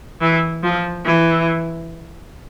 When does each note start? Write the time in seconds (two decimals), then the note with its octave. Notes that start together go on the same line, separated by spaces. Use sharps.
0.21 E3
0.63 F3
1.06 E3